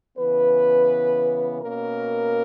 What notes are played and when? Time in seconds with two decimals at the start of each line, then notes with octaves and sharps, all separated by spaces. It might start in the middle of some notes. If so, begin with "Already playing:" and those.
0.18 C#3 E3 B3 B4
1.61 B2 A#3 C#4 A#4